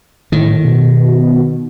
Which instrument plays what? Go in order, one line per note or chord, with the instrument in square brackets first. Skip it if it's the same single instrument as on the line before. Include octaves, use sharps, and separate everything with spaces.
[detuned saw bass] A2 [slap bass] D#3
[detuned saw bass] B2